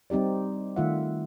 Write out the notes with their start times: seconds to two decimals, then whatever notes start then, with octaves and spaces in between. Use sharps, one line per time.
0.10 G3 C4 D#4 G4 D5
0.76 D#3 A3 F4 E5 F#5